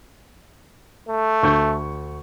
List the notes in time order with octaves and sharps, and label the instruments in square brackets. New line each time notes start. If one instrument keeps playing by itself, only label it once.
[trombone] A3
[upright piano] D2 C#6 G6